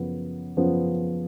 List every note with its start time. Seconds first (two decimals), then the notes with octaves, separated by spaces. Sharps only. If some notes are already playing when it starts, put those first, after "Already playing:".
Already playing: F#2 C#3 F3 B3
0.57 F#2 C#3 F3 B3